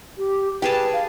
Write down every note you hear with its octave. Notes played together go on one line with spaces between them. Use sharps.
G4
G4 G#4 B4 A5
F5